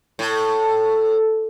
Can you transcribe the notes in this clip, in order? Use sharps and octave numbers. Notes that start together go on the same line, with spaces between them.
A2